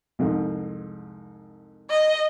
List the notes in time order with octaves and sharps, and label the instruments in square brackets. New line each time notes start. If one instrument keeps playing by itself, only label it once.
[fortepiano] C2 F2 G#2
[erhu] D#5